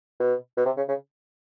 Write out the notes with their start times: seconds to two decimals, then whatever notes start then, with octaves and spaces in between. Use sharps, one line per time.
0.20 B2
0.57 B2
0.66 C3
0.77 C#3
0.89 C#3